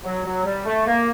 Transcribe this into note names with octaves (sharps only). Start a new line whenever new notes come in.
F#3
F#3
G3
A3
A#3